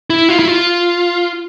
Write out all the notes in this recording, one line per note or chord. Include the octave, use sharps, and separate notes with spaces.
E4
F4
E4
F4